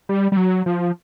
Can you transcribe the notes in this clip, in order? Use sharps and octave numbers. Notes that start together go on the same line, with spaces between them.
G3
G3
F#3
F3